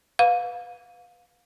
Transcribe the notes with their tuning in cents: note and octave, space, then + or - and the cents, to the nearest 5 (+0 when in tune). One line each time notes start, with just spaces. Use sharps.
B4 +0 F5 +30